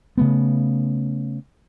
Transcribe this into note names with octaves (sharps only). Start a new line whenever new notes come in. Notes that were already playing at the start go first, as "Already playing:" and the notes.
C#3 A3 B3